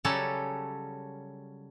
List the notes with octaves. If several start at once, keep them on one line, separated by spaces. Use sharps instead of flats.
C#3 F#3 G3 C#4 A4 A5